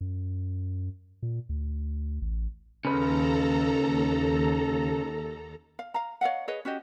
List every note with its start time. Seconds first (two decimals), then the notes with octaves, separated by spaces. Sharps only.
0.01 F#2
1.23 A#2
1.49 D2
2.22 A1
2.85 D#2 C#3 A4 B4 A#5
5.79 F5
5.94 F5 A#5
6.21 C#5 D#5 F5 F#5
6.48 G#4 B4 C#5 D#5
6.65 C#4 F#4 G4 D#5